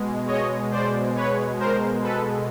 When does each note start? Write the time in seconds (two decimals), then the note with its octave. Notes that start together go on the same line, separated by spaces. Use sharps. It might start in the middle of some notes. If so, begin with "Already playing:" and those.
Already playing: B2 G#3
0.27 C#5 D#5
0.72 C5 D5
1.16 B4 C#5
1.59 A#4 C5
2.03 A4 B4